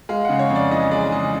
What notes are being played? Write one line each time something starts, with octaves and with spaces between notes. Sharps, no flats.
G#3 F5
C#3 F#5
C#5
F2
D5
E3 D#5
G#3 D5
C#3 D#5